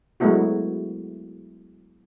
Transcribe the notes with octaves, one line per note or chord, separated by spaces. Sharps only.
F#3 G#3 A3 B3 E4 F#4